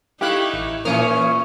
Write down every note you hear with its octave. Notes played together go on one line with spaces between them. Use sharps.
A3 D#4 E4 G4 F5 F#6
A1
A#2 E3 A#3 C#4 D#6 F6